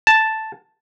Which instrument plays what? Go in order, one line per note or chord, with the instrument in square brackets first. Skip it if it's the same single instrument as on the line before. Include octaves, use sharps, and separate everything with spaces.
[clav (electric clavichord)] A5